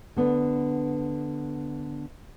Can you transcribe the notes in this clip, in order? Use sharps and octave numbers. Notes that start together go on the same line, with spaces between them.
D3 B3 D4